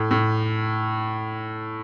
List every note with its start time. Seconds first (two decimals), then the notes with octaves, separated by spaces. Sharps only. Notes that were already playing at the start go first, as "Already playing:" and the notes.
Already playing: A2
0.11 A2